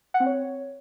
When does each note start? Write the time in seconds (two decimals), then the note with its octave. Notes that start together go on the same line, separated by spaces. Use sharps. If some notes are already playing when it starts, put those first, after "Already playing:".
0.14 F#5
0.20 C4
0.26 C#5